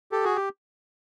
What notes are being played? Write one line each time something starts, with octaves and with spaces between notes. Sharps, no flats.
G4 A4
F#4 G#4
G4